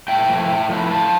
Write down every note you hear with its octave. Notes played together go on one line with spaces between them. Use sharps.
A2 E5 G5
F3 A3 E4
A2
F3 A3 E4
A2 F5 A5